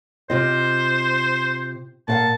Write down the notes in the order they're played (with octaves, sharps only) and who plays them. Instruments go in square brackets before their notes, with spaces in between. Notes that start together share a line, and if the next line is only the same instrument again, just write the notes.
[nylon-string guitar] C3 F4 D#5 [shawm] C5
[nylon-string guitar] A#2 F5 F#5 [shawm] A5